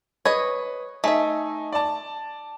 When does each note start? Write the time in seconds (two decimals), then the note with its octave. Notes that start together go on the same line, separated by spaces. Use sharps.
0.25 B4 C#5 D#5
1.04 A3 D#4 E5 G#5
1.73 D5 A5